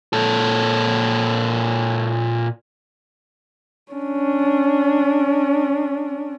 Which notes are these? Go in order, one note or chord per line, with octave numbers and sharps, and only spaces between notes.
A#2 A4
C#4 D4